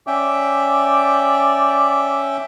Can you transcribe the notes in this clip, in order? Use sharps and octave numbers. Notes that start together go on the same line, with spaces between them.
C#4 D5 E5 G5